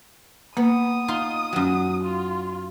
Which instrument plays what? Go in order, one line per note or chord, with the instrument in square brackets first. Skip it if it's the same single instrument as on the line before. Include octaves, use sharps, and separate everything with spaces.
[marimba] A#3 [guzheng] B3 [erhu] D#6
[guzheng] D#4 F4 C6
F#2 F#3
[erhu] F4